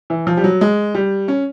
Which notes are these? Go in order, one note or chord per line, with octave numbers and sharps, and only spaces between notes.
E3
F3
G3
F#3
G#3
G3
C#4